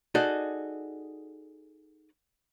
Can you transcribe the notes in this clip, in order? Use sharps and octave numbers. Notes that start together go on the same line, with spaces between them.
D#4 F#4 G#4 A4 D5 D#5